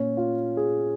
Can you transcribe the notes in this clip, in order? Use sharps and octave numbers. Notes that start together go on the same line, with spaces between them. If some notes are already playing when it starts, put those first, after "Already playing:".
Already playing: A#2 A#3 C#4
F4
G#4